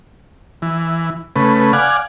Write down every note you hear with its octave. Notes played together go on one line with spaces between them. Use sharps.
E3
C#3 A3 B4
D5 F5 F#5 G#5